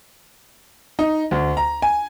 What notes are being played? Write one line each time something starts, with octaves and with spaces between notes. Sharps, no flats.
D#4
D2
A#5
G#5